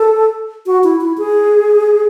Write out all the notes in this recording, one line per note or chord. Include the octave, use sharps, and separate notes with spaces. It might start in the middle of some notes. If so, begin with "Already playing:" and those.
Already playing: A4
F#4
E4
E4
G#4